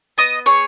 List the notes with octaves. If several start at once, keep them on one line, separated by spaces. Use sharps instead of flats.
B3 D#5
G#4 C#5